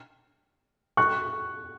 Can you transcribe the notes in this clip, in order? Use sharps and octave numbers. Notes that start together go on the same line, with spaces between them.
C#6 F#6